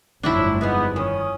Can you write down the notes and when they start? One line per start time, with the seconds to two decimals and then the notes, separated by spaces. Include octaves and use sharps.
0.23 G1 F2 A2 F3 F#3 D4 E4
0.61 G#3 B3 D#4 G#4
0.96 D#3 C#4 D#6